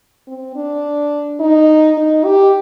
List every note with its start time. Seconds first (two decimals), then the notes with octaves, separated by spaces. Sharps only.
0.28 C4
0.56 D4
1.40 D#4
1.97 D#4
2.25 G4